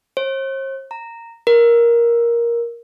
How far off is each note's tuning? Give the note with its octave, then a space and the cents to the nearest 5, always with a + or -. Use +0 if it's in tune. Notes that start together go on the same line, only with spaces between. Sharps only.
C5 +45
A#5 -10
A#4 +10